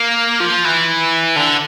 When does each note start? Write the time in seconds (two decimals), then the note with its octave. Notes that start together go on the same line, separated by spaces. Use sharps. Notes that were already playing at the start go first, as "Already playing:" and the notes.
Already playing: A#3
0.40 F3
0.65 E3
1.36 D3